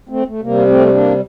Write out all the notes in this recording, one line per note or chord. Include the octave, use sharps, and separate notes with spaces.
A3 C4
A3
C3 A#3
G3
A3 C4
C4
A#3 D4